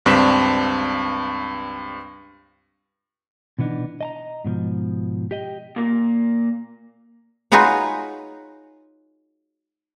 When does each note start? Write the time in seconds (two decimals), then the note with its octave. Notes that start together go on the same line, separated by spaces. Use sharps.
0.05 C#2 G2 C4 D4 B6 E7
3.59 B2 E3 B3 D4 D#4
4.01 D#5 A5 A#5
4.45 G#2 B2 E3 F3
5.31 G4 D#5 G5
5.76 A#2 A#3
7.52 D#4 F4 F#4 G#4 B4 C#5